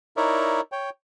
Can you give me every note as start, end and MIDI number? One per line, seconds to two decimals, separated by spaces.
0.17 0.61 63
0.17 0.61 64
0.17 0.61 70
0.17 0.61 73
0.17 0.61 74
0.17 0.61 76
0.72 0.90 73
0.72 0.90 79